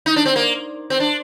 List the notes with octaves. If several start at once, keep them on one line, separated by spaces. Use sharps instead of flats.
D#4
D4
C4
A#3
C4
D4